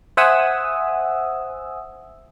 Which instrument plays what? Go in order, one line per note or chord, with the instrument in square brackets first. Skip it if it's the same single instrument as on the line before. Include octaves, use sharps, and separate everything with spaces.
[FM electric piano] C5 E5 F#5 G#5 D#6 E6